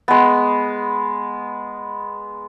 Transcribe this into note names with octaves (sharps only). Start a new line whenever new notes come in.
G#3 B3